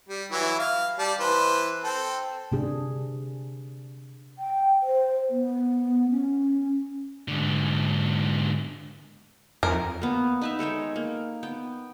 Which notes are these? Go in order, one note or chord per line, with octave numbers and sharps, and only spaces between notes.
G3
E3 F#3 E4
F5
G3 D5 A5
E3 B4 C5
C4 A4
C3 D4 G#4
G5
C5
B3
C#4
G#2 D3
F2 A#4
A#3 B3
D#4 B4 E5
G#3 A4 C#5 G5
A#3
B3 G5